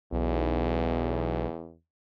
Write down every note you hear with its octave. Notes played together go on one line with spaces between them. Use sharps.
B1 E2